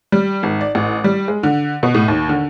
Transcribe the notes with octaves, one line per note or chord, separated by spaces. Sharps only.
G3
G#1
D5
A1
G3
G#3
D3
B2
A2
D#2
D3